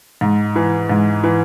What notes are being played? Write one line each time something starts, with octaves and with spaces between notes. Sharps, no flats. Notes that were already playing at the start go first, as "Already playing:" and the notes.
G#2
E3
G#2
E3